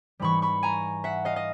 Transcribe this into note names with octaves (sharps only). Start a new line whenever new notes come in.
G#2 E3 G3 B5 C#6
B5 C#6
G#5 A#5
E5 F#5
D#5 F5
D#5